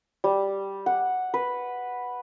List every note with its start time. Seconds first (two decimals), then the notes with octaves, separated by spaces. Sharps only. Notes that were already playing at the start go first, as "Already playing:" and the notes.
0.24 G3
0.86 F#5
1.34 B4